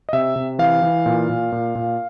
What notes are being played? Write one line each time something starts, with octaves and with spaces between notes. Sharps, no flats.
D#5
C3 E5
C3
E3 F5
E3
A#2
A#2
A#2
A#2